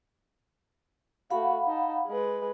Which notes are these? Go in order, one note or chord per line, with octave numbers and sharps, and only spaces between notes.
A3 F#4 F5 F#5 B5
D#4 A5
G#3 B4